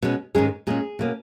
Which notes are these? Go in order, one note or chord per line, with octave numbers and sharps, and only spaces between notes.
B2 G#3 C#4
G#2 D#3 G#3 C#4 G#4
A#2 G#3 C#4 G#4
B2 A#3 C#4